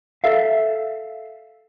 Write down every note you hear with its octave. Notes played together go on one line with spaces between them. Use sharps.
A4 E5 F5